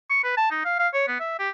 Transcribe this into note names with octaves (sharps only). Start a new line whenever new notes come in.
C#6
B4
A5
D#4
F5
F5
C#5
B3
E5
G4